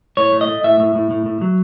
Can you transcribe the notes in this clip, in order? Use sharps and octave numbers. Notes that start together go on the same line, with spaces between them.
A2 C#5
A3
D#5
A3
A2 E5
A2
A2
A2
A2
F#3